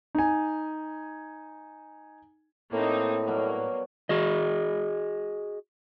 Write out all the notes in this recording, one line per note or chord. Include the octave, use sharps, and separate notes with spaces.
D#4 G#5
A2 A#3 C4 D#4
B2 F#3 G3 A#3
F#4 G#4 D#5